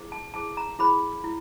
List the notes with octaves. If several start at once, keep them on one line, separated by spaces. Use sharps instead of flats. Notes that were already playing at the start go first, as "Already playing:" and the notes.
Already playing: E4 G#4 C5
A5
E4 G#4 C5 A5
A#5
E4 G#4 C5 B5
E4